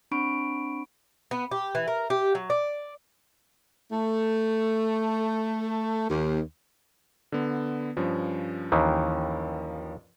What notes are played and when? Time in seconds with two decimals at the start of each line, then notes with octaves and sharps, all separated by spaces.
0.11 C4 D4 B5 C#6 D7
1.31 B3
1.51 G4
1.75 E3
1.88 A#4
2.10 G4
2.35 F#3
2.50 D5
3.91 A3
6.09 D#2
7.32 D3 B3
7.97 G2 F3 C#4
8.72 D#2 D#3 E3